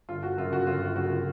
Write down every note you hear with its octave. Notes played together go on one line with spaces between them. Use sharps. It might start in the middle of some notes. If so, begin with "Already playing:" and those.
G1 F4
F#4
F#2 C#3 F4
F#4
G1 F4
F#2 C#3 F#4